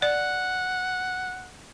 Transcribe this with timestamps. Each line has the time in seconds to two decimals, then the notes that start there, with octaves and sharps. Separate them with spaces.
0.02 D5 F#5